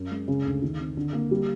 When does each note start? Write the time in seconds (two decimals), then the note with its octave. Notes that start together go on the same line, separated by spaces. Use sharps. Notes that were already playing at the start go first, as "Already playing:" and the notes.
Already playing: F#2
0.11 G#3
0.28 C#3
0.45 D2
0.62 D#3
0.79 C4
0.97 D3
1.13 A#3
1.31 G3